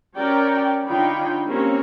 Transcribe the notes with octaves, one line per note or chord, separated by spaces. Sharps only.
C#4 F#4 A#4 C#5 D5 G5
D3 D#4 F4 C#5 G5 B5
A#3 C4 C#4 G4 C#5